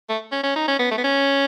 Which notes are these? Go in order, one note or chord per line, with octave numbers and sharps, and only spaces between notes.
A3
C#4
C#4
D#4
C#4
B3
A3
B3
C#4